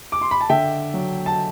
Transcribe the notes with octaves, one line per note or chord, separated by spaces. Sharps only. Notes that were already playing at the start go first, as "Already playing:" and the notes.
D6
C6
B5
A5
D3 E5 G5
F#3
A5